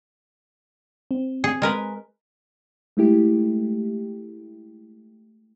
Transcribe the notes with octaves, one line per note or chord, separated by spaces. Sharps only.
C4
G#4
G#3 A#4 B4
G#3 A3 E4 G4